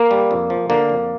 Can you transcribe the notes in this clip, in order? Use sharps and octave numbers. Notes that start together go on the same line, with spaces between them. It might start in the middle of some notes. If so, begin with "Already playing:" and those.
Already playing: A#3
G3
F2
F3
D3 A#3
F2